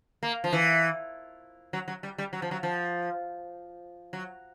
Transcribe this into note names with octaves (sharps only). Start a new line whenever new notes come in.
A#3
F3
E3
F#3
F#3
G3
G3
F#3
F3
F#3
F3
F#3